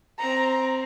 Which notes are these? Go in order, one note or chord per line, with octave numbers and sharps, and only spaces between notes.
C4 A#5